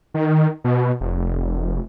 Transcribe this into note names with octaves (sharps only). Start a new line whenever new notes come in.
D#3
B2
F1